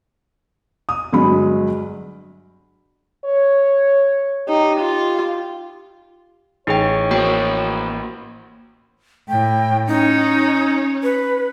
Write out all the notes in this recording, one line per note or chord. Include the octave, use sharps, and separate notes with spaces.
D#6
G1 F#3 G#3 B5
C#5
D#4 G4
F4
A1 D#4 G#4 C#5 G5
A#3 F#4 A#4 C5 G5 C#6
A2 G5
C#4 D#4
B4